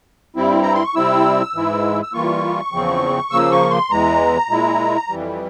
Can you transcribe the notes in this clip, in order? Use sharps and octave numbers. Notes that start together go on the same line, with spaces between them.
G2 G3 C4 E4
A#5
C6
C#6
C3 G3 C4 E4 E6
G#2 E3 G#3 E4
E6
E3 G3 A#3 F4 C#6
E2 C#3 F3 C4
C#3 F3 A#3 E6
C#6
C6
E2 E3 G#3 A#5
A#2 G#3 E4
F2 E3 G3